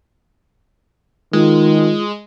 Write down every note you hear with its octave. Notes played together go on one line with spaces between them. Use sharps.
D#3 G#3 F4